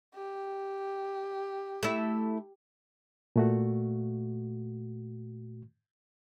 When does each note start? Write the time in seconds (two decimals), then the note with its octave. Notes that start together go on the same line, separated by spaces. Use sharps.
0.15 G4
1.83 A3 E4
3.36 A#2 A3 F#4